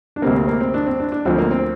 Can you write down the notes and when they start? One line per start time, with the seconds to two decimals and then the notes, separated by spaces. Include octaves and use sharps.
0.16 D4
0.22 D2 C3 G3 A#3 C4
0.36 C4
0.48 A#3
0.61 C4
0.74 D4
0.86 C4
1.00 D4
1.12 D4
1.25 D2 D3 F3 C4
1.38 A#3
1.51 C4